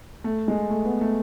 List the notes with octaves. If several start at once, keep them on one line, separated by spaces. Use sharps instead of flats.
A3
G#3
A3
B3
A3